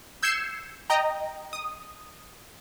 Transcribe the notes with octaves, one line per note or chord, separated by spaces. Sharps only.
E6 G6 G#6 C7 C#7 E7
D#5 G5 A#5
D#6